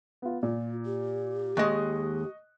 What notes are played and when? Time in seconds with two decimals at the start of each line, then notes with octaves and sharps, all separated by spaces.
0.22 B3 F4
0.43 A#2 F4
0.85 G4
1.57 D#2 G#3 D#5 C#6 F#6